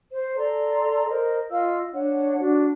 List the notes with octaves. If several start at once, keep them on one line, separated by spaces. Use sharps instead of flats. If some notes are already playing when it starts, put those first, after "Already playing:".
C5
A4 D5 A#5 C6
A#4 C5 D#5
F4 D#5 F5 E6
D4 C#5 F#5
D4 F#4